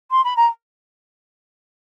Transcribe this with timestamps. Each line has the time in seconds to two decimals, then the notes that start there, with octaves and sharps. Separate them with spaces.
0.11 C6
0.24 B5
0.36 A#5